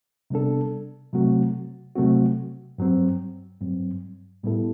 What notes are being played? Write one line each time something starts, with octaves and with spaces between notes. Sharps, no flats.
C3 G3 B3 D4 A4
C3 F#3 A3 C4 F#4
C3 F#3 A3 C4 F#4
G2 F#3 C4
G2 F#3 C4
A2 G3 B3 E4 A4